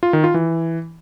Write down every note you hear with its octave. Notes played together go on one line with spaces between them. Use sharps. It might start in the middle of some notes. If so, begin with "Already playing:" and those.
F4
D#3
F4
E3